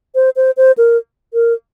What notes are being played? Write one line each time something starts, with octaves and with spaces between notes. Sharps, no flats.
C5
C5
C5
A#4
A#4